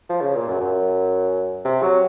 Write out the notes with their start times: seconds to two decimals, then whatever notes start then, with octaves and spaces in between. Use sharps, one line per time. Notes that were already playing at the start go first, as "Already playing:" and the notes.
0.10 F3
0.21 C#3
0.36 A#2
0.48 F#2
0.61 F#2
1.65 C3
1.83 F#3